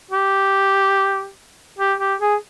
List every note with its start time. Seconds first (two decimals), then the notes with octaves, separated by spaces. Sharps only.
0.11 G4
1.79 G4
1.99 G4
2.20 G#4